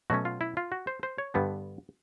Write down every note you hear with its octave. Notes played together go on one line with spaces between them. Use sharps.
B2 F#3 A3 C#4 F#4
F4
E4
F4
F#4
C5
C5
C#5
G2 D3 G3 B3 D4